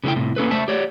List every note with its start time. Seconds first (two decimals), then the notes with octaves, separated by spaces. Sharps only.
0.04 C#3 F3 A3 E4 G5
0.16 A2 C3
0.36 A#3 C#4 A4 B4
0.51 A3 C5 E5 A5
0.68 G4 C#5 D5